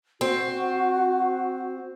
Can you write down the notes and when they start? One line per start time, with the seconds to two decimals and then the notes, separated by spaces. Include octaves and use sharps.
0.21 C4 F#4